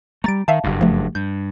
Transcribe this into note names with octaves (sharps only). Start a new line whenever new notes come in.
G3 A3 A#5 A6 D7
D#3 E5 F5 A5
F#1 G2
F3 A3
G2 G6